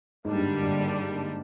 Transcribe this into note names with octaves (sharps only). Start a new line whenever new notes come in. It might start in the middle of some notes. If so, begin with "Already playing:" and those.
G#2 D3 G3 A#3 D4
G2
G2